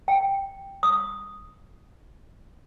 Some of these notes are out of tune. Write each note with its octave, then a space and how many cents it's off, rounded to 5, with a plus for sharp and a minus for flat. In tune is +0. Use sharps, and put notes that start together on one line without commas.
G5 +5
D#6 +0